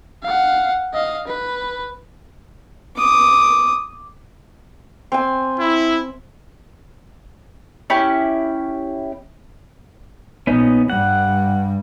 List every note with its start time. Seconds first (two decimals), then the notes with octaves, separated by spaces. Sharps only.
0.23 F5 F#5
0.94 D#5 F5
1.27 B4
2.97 D6 D#6
5.12 C4 G#5
5.60 E4
7.90 C#4 E4 G4
10.47 A#1 B3 C#4 D#4
10.90 G2 G3 F#5